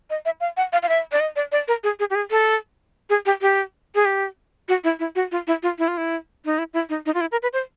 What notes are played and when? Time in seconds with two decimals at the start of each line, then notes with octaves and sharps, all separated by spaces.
0.10 D#5
0.25 E5
0.40 F5
0.57 F#5
0.73 F5
0.83 F5
0.89 E5
1.12 D5
1.20 D#5
1.36 D5
1.52 D5
1.68 A#4
1.84 G#4
2.00 G#4
2.10 G4
2.15 G#4
2.31 A4
3.10 G#4
3.26 G4
3.41 G4
3.95 G#4
4.05 G4
4.69 F#4
4.84 E4
4.99 E4
5.16 F#4
5.32 F4
5.47 E4
5.63 F4
5.79 E4
5.88 F4
5.97 E4
6.45 D#4
6.58 E4
6.74 E4
6.89 D#4
7.06 D#4
7.15 F4
7.21 E4
7.32 A#4
7.43 B4
7.53 C5